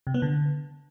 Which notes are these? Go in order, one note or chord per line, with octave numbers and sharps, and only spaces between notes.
C3
B3
D3